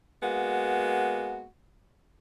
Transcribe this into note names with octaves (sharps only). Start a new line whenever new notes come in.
G#3 A#3 B3 F#4